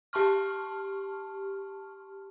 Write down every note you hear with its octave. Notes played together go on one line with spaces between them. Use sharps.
G4 A5 C6 C#6 F6